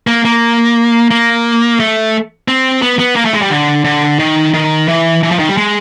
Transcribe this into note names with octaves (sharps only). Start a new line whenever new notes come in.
A#3
A#3
A#3
A3
C4
B3
B3
A#3
A3
G#3
G3
D3
D3
D#3
D#3
E3
E3
F3
D#3
G3
G#3